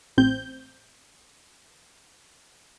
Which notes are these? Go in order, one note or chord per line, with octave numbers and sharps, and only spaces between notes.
A1 C4 G6